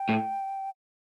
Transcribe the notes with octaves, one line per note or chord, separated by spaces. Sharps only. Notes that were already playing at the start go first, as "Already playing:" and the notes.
Already playing: G5
A2